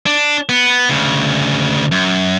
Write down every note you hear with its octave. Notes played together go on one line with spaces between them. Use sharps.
D4
B3
D2 C#3
F#2